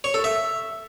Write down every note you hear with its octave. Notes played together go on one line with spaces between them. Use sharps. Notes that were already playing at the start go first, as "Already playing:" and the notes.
C#5
A4
E5